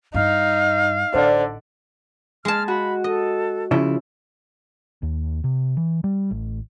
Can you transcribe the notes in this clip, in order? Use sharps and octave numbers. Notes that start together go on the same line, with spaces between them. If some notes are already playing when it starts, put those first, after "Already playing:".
G2 D#4 F5
A1 D3 C5 D5
G#3 A5 F6
F#4 B5
A4 D#5
C#3 F3 E4
D#2
C3
E3
G3
A1